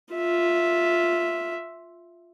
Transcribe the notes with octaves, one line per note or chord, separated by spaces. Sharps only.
F4 E5